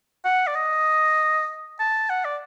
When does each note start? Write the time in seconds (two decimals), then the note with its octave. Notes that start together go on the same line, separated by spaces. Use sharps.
0.25 F#5
0.47 D5
0.55 D#5
1.80 A5
2.10 F#5
2.25 D5